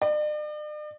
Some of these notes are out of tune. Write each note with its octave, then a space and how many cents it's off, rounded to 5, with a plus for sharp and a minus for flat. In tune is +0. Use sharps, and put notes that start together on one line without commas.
D5 +45